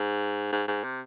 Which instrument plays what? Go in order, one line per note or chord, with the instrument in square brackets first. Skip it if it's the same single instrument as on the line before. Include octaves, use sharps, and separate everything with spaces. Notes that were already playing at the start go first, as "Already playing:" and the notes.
Already playing: [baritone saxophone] G#2
G#2
G#2
C3